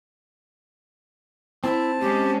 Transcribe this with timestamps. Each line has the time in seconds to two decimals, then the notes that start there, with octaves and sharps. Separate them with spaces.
1.64 C4 E4 A5
2.01 G#3 C#4 G4